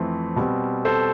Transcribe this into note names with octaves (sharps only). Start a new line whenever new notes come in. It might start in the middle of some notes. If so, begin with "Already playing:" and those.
Already playing: F2 E3 A3 C4
B2 G3 C4
A4 C5